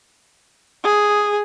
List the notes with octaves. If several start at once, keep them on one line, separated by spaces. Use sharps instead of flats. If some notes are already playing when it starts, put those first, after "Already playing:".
G#4